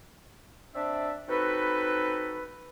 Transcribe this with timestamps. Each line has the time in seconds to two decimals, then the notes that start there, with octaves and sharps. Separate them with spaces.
0.75 C4 D4 D5 E5
1.29 C4 D#4 F#4 A4 B4